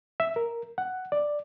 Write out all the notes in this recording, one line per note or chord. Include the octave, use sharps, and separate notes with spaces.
E5
A#4
F#5
D5